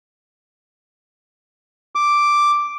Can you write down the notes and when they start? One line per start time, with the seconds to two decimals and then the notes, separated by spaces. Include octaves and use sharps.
1.95 D6